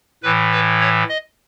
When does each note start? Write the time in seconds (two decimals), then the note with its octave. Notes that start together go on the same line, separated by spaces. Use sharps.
0.23 A2 E3 B4
0.52 B4
0.81 C#5
1.09 D#5